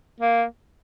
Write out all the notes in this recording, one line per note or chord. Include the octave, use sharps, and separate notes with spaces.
A#3